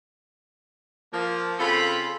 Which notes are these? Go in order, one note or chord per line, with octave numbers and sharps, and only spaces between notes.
F3 A#3
C#3 C4 F4 A4 B5